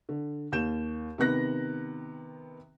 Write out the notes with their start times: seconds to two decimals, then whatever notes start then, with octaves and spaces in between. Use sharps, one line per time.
0.09 D3
0.52 D#2 G6 E7
1.18 C3 D#3 B3 F#6 A#6